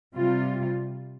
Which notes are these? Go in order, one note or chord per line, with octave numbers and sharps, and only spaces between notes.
C3 G3 F4